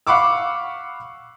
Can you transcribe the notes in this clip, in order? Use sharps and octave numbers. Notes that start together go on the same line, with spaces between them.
F5 F#5 B5 C#6 D6 E6